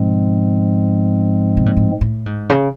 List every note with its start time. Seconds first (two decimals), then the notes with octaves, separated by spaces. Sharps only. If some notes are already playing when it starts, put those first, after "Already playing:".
Already playing: G#2 B2 F3 G#3 C4
1.57 B2
1.66 A#2
1.77 A2
2.01 A2
2.26 G#2
2.50 C#3